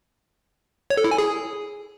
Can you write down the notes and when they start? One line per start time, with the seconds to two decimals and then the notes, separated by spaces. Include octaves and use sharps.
0.90 C#5
0.97 A4
1.04 E4
1.11 G#5
1.18 G#4